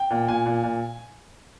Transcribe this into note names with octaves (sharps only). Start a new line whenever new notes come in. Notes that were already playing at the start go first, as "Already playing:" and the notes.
Already playing: G5
A#2
A#2 G#5
A#2
A#2